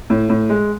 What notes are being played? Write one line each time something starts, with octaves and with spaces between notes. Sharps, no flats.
A2
A2
G#3